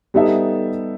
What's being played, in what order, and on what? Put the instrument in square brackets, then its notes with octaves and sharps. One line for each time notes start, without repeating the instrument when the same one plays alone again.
[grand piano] G3 B3 D#4 A4 E5